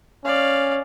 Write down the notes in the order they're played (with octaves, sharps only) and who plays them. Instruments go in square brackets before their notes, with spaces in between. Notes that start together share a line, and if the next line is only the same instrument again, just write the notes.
[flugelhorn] C#4 [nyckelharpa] D5 F5